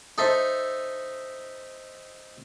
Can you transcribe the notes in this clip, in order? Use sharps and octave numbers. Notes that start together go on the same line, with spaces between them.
D#4 A4 C5 E5